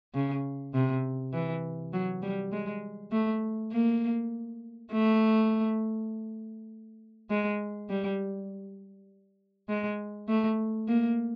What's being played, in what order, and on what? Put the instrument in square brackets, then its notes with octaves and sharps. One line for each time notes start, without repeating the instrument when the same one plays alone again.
[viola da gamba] C#3
C3
E3
F#3
G3
G#3
A3
A#3
A3
G#3
G3
G#3
A3
A#3